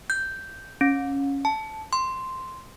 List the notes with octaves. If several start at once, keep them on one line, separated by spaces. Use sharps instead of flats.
G6
C#4
A5
C6